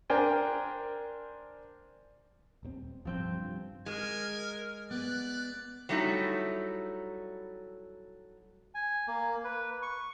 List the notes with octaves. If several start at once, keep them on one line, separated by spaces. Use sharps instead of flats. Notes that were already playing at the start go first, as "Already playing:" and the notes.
D4 A#4 C5 G5 G#5
D#1 A#2 C4
D1 G2 F3 C4 G6
G2 C3
G2
G#3 A#4 G#5
B3 D5 F#6
F#3 G3 A3 D#4 E4
G#5
A#3
B4
C#6